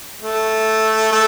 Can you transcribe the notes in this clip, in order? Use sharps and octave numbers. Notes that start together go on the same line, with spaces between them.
A3
A3